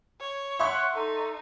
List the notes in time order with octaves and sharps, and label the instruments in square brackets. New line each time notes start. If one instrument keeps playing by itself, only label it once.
[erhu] C#5
[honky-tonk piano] E5 C6 C#6 [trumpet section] F#5
[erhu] D#4 [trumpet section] A4